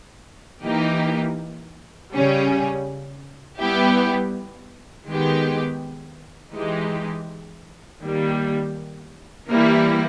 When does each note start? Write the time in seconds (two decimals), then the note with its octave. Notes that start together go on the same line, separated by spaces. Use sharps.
0.64 E3 A#3 D#4 G4
2.13 C#3 G3 C#4
3.60 G3 B3 E4 G4
5.07 D#3 G#3 B3 G4
6.54 E3 G#3 D#4 G4
8.01 D#3 G3 A#3
9.48 E3 G3 A#3 E4